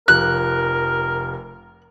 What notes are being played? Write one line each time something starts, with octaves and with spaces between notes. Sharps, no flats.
F1 F3 A#4 F#6